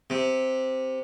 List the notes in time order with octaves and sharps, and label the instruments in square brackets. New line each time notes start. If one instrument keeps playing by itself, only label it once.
[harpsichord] C3